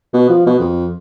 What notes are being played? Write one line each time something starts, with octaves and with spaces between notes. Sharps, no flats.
B2
F3
B2
F2